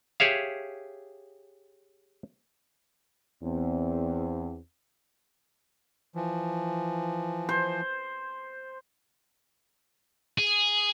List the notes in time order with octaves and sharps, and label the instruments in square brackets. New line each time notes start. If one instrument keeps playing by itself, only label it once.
[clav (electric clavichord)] G4 G#4 C#5 E5 F5
[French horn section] E2 C4
[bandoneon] E3 F3
[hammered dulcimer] C5
[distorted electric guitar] G#4